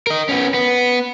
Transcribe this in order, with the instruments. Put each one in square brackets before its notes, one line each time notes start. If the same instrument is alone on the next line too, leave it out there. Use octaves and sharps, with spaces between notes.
[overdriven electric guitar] A#4 D#5
B3 C#4
B3